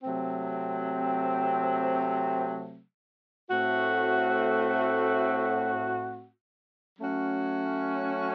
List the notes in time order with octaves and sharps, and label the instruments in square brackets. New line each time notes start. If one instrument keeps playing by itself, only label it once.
[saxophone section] C3 F#3 A3 C4
A2 A3 C4 F#4
F#3 A3 C#4 F#4